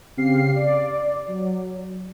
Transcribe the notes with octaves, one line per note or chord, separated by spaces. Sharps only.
C#3 C4 G4 F5 C7
D5
F#3